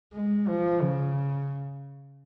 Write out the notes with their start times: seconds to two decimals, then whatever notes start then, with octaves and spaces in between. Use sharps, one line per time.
0.14 G#3
0.48 F3
0.82 C#3